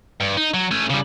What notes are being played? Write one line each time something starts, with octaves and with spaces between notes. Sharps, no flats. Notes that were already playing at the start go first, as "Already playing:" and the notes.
G2
D#4
F#3
A3 C#4
C#3 G3